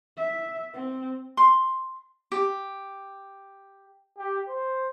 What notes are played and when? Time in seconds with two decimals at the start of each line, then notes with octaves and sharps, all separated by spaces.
0.17 E5
0.73 C4
1.37 C6
2.32 G4
4.18 G4
4.48 C5